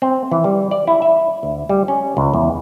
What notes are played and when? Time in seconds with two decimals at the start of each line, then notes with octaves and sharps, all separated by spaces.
0.02 C4
0.32 E3
0.44 G3
0.71 D5
0.87 E4
1.02 E5
1.43 D2
1.69 G3
1.88 C#4
2.17 C#2
2.34 E2